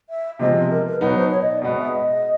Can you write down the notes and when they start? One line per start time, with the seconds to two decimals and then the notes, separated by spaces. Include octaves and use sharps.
0.10 E5
0.39 C3 F3 G#3 C4 D#5
0.55 D#5
0.71 A#4
0.86 B4
1.01 B2 F#3 B3 D#4 B4
1.16 C5
1.31 C#5
1.41 D#5
1.52 D5
1.62 B2 G#3 B3 D#5
1.78 E5
1.92 D#5